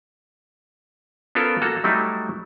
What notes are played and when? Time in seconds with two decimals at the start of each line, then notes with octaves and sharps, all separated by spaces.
1.35 B3 C#4 F4 A4 A#4
1.62 A#3 F#4 A4 F5
1.84 F#3 G3 A3 D#4 E4